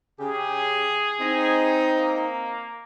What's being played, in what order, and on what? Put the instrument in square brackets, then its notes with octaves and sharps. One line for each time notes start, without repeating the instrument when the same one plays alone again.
[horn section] C#3 G4 [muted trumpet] G#4
[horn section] C4 D#4
[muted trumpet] A#3